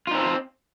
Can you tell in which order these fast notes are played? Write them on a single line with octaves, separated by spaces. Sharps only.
F4 D#4 C4